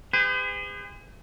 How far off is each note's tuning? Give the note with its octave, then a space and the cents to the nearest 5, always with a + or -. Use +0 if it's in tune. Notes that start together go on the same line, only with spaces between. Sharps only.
G#4 -40 C5 -45